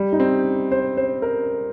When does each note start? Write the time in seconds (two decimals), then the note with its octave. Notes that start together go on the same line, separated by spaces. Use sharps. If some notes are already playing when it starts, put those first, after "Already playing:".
Already playing: G3
0.13 D#4
0.20 C4
0.72 C5
0.97 C5
1.22 A#4